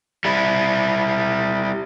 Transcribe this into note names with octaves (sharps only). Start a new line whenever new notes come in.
G3 E4